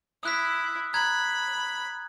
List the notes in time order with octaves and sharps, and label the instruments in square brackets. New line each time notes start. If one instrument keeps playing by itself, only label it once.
[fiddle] E4 [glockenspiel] D#6 F#6 B6
[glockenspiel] A#5 F#6 G#6 [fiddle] B5